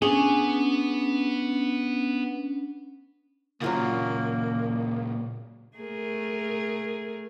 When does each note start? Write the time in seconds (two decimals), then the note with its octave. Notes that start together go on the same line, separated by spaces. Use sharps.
0.02 B3 C#4 D4 G#4
3.62 A#2 C#3 F#3 A#3 F4 F#4
5.77 A3 G#4 A#4